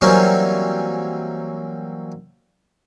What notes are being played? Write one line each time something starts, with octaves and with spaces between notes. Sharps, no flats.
E3 F#3 G3 A#3 C4 C#4